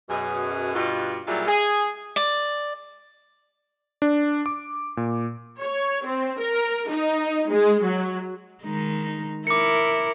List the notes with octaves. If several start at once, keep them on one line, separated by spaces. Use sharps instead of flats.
F#2 B2 G#4
G2 B2 F4
A#2 F#3 G3 E4 F4 G#4
G#4
D5
D4
D6
A#2
C#5
C4
A#4
D#4
G#3
F#3
D#3 G#3 D#4
E4 A#4 D6 C#7